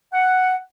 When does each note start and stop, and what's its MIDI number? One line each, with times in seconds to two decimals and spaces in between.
0.13 0.56 78